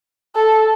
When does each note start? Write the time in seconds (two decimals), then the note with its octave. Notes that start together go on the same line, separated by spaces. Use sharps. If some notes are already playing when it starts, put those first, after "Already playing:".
0.36 A4